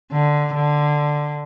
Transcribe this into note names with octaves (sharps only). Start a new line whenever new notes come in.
D3
D3